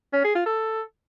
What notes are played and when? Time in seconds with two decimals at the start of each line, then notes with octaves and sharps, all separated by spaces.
0.14 C#4
0.24 G#4
0.35 F4
0.46 A4